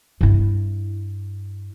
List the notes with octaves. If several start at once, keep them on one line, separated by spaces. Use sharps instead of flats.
G2 E4